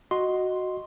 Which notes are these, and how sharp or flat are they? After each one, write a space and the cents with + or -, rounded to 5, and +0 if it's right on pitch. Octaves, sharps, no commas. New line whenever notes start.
F#4 +0 D#5 +0 C6 +0